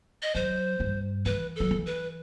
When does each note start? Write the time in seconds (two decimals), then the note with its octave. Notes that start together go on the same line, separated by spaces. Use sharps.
0.23 D#5
0.35 F#3 C5
0.80 G2
1.26 E3 B4
1.56 F#3 A4
1.71 E3
1.86 B4